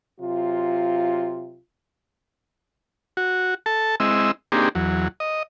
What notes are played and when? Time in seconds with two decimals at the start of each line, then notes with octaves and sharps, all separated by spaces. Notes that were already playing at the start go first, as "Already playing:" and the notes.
0.20 C3 F#3 F4
3.17 F#4
3.66 A4 A5
4.00 G#3 C4 E4 D#5 E6
4.52 A#3 C4 D4 D#4 G4 G#4
4.75 E2 F#3
5.20 D#5